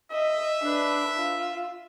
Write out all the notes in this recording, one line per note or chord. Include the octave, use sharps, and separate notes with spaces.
D#5 E5
D4 B4
F4